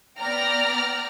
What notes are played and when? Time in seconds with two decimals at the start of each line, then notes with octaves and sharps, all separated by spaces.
0.20 B3 D5 G5 A#5 F6 A#6